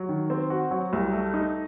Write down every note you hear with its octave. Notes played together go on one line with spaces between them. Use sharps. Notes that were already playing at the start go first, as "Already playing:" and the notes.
Already playing: F#3
D#3
C4
F#4
F#3
C2
A3
D#4